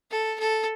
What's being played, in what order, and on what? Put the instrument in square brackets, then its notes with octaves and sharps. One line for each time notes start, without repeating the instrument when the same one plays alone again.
[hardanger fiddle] A4
A4